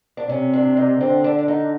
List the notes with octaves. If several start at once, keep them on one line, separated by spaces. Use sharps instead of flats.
D4
C3 C#4
D4
D#4
D3 C4
D4
D4
D#4